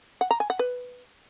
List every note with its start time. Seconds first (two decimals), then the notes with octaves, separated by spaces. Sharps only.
0.21 F#5
0.31 A#5
0.40 G#5
0.50 F#5
0.59 B4